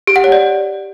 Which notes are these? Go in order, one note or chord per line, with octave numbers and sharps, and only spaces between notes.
G4
F#5
C#5
D5